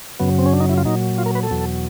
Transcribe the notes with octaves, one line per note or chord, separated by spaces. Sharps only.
F#2 C#3 F#3 B3
C4
C#4
D4
D#4
E4
F4
A#2 F#3 D#4
F4
A#4
B4
A4
E2 B2 F#3